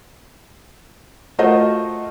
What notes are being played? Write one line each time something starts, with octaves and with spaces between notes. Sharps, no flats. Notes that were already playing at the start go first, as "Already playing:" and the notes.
A3 F4 F#4 A#4 C5 D#5